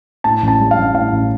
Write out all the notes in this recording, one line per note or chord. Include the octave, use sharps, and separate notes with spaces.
A2 A5
A1
A5
G3
F5
A1
A2 F5
A1